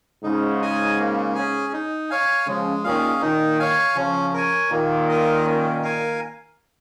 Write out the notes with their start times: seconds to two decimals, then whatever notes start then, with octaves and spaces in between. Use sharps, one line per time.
0.23 G#2 C#3 D#4
0.62 G#4 D#5 G#5
0.98 A#3
1.35 C#4 G#4
1.73 D#4
2.10 C#5 F5 G#5
2.47 C#3 F3 G#3
2.84 A#2 D#3 C#4 G#4 F5
3.21 A#2 D#3 D#4
3.60 C#5 F5 G#5
3.96 C#3 F3 C#4
4.34 A#4 C#5 G#5
4.71 A#2 D#3 A#3
5.09 F4 A#4 D#5
5.45 C#4
5.82 A#4 F5 G#5